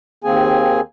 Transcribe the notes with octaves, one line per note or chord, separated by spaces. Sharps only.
D#2 D#3 A#3 C4 G#4 G#5